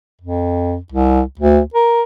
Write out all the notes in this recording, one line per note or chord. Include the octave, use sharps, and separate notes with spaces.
F2
C2
D2
A#4